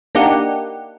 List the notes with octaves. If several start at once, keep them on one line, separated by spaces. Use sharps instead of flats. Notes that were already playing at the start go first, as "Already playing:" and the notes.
A#3 D4 D#4 G4 F#5